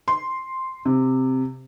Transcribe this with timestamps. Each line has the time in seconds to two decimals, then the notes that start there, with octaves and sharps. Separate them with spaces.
0.08 C6
0.85 C3